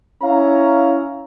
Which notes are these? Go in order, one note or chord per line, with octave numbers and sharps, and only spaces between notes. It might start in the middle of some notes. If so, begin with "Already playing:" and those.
C#4 E4 F5 A#5